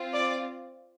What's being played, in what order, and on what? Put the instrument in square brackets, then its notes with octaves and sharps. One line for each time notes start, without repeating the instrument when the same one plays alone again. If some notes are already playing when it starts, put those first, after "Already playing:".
Already playing: [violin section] C4 F4
D5